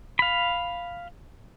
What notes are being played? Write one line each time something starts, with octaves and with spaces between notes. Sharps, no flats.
F5 B5